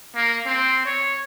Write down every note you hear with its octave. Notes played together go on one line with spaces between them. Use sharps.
A#3
C4
C#5